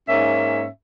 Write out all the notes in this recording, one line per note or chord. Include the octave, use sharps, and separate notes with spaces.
G#2 A#3 C#4 E5